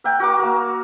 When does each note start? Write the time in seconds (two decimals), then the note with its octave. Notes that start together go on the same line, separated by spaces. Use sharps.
0.04 A#4 E5 F#5 G5
0.20 F#4 A#4 D6
0.39 A#3 A#4